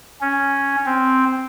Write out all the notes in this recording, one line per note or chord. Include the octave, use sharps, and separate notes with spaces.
C#4
C4